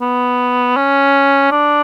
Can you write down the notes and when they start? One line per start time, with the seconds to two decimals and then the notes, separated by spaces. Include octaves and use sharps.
0.01 B3
0.77 C#4
1.51 D4